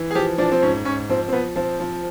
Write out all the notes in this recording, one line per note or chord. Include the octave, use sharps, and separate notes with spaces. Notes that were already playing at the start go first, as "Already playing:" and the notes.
Already playing: E3
G#4
F3 G4
F3 D4
C4
G#2 C#4
G#2 C#4
F3 C4
C4
F3 B3
F3 C4
F3